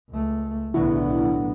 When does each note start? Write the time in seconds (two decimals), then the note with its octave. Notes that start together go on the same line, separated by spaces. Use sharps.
0.10 C#2 A3
0.74 B1 A2 D3 F#3 B3 E4